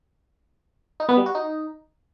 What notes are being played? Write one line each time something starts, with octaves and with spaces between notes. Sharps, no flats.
D#4
B3
G3
F#4
D#4